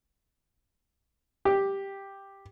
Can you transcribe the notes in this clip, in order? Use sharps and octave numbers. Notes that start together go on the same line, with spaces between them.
G4